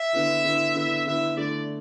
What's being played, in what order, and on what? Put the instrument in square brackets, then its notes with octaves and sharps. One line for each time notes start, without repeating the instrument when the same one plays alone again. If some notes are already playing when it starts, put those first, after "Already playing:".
Already playing: [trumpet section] E5
[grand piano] D3 B3 E4
D3 B3 E4
[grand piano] D3 B3 E4 [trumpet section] E5
[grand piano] D3 B3 E4 [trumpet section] E5
[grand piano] D3 A3 E4 [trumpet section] D5